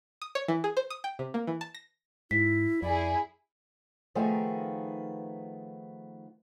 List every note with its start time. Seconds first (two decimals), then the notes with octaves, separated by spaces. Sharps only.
0.22 D#6
0.35 C#5
0.48 E3
0.64 G#4
0.77 C5
0.90 D#6
1.04 G5
1.19 C3
1.34 A#3
1.47 E3
1.61 A5
1.75 A#6
2.31 G#2 E4 B6
2.82 F2 E4 G#4 D5
4.15 D#3 F3 A3 B3 D#4 G#4